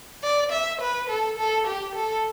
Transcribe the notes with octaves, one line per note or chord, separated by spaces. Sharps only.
D5
E5
B4
A4
A4
G4
A4